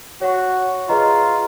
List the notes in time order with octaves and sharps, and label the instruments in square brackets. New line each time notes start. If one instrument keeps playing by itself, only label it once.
[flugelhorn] F#4 [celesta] C#5 F#5 C#6
[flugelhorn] F4 [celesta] G#4 B4 D#5 A#5